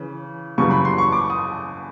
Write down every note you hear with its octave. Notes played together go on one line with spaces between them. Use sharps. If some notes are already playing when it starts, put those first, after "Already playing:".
Already playing: C#3 E3
F#2 C#3 E3 G3 C#6
B5
C6
C#6
D6
D#6